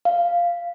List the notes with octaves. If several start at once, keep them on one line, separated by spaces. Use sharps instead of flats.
F5